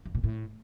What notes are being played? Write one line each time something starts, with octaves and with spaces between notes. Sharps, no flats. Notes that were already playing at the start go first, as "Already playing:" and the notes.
F2
A#2
A2